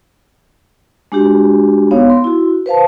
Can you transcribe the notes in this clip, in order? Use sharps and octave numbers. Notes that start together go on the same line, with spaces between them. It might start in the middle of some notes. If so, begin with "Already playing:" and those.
G#3 D4 F#4 G4
B3 D#4 C#5 F5
C6
E4 F#4
B4 C5 F5 A5